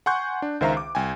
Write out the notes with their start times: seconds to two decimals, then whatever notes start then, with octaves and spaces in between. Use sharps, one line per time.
0.06 F#5 G#5 C6 C#6 F#6 G6
0.42 D4
0.61 C#2 D#3 C5 E5 F5 A#5
0.77 D6
0.95 C2 G5 G#5